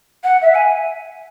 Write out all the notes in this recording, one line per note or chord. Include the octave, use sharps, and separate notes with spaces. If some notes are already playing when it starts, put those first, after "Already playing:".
F#5
E5
G#5